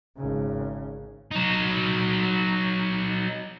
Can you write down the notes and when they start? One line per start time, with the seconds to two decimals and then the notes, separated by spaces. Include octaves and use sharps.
0.17 G#1 C#3
1.31 F#3 D#4